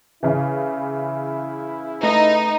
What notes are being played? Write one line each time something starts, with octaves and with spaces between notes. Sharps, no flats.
C#3 E3 E4
A3 D#4 B4